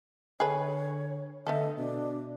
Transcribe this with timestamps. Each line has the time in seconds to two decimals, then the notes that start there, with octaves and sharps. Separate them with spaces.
0.40 D3 G#4 A4 B4 C#5
1.47 D3 A3 B3 A4 D#5
1.78 B2 D4